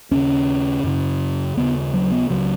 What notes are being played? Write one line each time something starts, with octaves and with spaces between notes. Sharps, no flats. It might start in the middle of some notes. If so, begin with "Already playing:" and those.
D#2 C#3 C#4
F#2 C#3
D#2 C#3 B3
F#3
B3
C#2 C#3 F#3